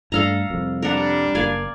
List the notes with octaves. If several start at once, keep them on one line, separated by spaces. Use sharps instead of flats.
G2 A3 D4 A4 F5 A#5
C2 F2
G3 D4 A#4 F#5
F#1 A#3 D5 F5 G#5